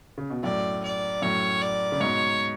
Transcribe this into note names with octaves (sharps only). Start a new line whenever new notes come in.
C#3
B2
F#2 A2 D5
D5
F#2 A2 C#5
D5
C#3
G#2 B2 C#5